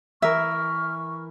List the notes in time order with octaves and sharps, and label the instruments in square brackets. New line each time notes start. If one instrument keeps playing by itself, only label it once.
[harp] E3 A#4 [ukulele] E5 [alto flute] C#6 [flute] F6